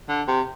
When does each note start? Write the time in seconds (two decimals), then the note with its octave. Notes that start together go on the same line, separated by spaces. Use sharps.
0.09 D3
0.28 C3